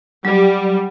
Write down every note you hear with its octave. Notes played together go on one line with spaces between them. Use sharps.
F#3 G3